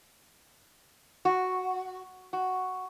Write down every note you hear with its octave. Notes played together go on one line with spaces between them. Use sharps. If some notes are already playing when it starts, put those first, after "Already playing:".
F#4
F#4